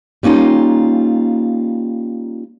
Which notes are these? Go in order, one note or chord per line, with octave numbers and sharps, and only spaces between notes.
G3 A#3 C#4 D#4 F4